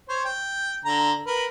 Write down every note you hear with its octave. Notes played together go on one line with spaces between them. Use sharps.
C5 C#5
G5
D3 A#5
A#4 B4